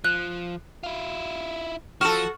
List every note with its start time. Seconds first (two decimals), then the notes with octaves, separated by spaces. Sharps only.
0.04 F3 F#6
0.83 E4 F4
2.01 F3 F#4 A4 C#6 F6 E7